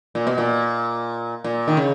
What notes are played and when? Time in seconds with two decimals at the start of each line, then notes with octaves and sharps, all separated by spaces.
0.15 A#2
0.27 B2
0.38 A#2
1.44 A#2
1.68 D#3
1.77 C#3